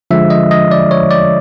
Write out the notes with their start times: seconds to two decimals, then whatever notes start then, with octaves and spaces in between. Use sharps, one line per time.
0.11 D3 F3 G#3 E5
0.30 D#5
0.51 D#5
0.71 D5
0.91 C#5
1.11 D5